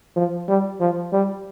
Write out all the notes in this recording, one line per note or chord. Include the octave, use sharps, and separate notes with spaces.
F3
G3
F3
G3